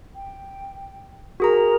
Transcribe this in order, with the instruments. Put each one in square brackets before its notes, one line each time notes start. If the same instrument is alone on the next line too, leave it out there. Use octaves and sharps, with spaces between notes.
[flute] G5
[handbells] F#4 G#4 A#5 [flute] A#4